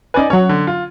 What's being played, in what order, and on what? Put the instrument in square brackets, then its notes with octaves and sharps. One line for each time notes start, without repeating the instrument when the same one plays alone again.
[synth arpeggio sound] C#4 B4 [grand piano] D#4 D5 G#5
[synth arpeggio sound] F#3 C#4 [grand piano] C#5 F#5
[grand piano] D3
F4